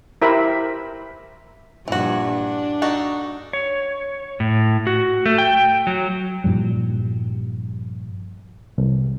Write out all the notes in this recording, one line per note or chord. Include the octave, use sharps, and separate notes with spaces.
E4 G4 A#4 C5 E5 B5
G2 A#2 E3 F3 F#4
D4
D#4 F#4 A4
C#5
A2
F#4
A3
G5
F#3
G2 A#2 F3 G3
C2